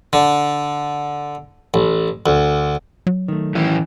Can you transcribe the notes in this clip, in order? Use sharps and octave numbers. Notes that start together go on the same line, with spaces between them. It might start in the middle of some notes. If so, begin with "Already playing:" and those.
D3
A1
D2
F#3
D#3 A3
E3 C#4 E4